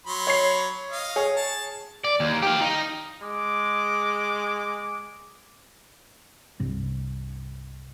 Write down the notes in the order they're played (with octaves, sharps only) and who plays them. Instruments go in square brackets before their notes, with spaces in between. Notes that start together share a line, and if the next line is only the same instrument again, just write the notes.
[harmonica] F#3 B5 C6
[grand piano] C#5 C7
[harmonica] D#5 F5
[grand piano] G#4 C#5
[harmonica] A5
[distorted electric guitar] D5
D#2
G4 F5
D#4
[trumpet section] G#3 D6
[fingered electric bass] C2 G2